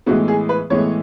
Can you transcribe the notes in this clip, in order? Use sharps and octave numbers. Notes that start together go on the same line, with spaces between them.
A2 E3 G#3 B3 F#4
G#4
B4
A2 E3 G#3 B3 C#5